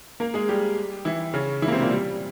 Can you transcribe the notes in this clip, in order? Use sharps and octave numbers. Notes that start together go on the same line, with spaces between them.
A#3 A#4
G#3 G#4
G3 G4
E3 E4
C#3 C#4
E3 E4
A#3
C3 C4
A#2 A#3
G3